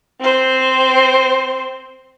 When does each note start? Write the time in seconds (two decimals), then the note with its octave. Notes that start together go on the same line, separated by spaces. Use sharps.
0.20 C4 C5